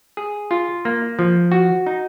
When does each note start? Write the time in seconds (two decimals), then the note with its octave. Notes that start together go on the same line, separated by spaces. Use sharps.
0.17 G#4
0.51 F4
0.85 A#3
1.19 F3
1.52 F#4
1.86 D#4